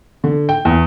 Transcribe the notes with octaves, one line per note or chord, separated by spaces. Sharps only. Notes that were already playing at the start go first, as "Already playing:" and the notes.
D3
G5
E2